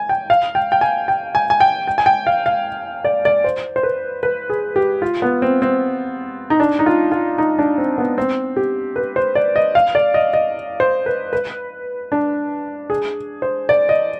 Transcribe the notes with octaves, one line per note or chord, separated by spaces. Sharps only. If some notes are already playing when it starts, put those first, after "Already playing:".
Already playing: G#5
G5
F5
G5
G5
G#5
G5
G#5
G#5
G5
G5
G#5
G5
F5
F5
D5
D5
C5
C5
B4
B4
G#4
G4
F4
B3
C4
C4
D#4
D4
D#4
F4
F4
D#4
D4
C4
B3
C4
G4
B4
C5
D5
D#5
F5
D5
D#5
D#5
C5
B4
B4
D4
G#4
C5
D5
D#5